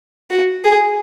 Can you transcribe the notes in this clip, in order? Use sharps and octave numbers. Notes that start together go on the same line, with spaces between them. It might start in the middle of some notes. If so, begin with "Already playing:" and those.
F#4
G#4